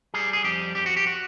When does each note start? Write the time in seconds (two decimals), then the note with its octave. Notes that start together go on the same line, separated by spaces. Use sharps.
0.14 G3 G#4
0.33 G#4
0.44 F2 G4
0.75 F2 G4
0.86 F#4
0.97 G4
1.07 F#4